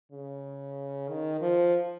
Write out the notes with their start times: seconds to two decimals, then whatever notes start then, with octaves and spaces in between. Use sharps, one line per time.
0.12 C#3
1.09 D#3
1.41 F3